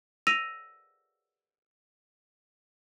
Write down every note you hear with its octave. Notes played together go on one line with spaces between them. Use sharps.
E6 A#6 D#7 F7